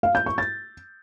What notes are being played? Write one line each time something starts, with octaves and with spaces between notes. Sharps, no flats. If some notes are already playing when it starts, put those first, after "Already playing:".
F5
G6
C#6
A6